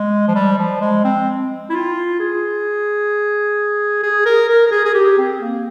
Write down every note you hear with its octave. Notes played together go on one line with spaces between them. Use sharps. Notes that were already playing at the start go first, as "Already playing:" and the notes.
Already playing: G#3
F3
G3
F3
G#3
C4
E4
F4
G#4
G#4
A#4
A#4
A#4
G#4
G#4
G4
C4
A#3